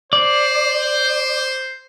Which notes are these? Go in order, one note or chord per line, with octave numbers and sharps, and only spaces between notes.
C5 D5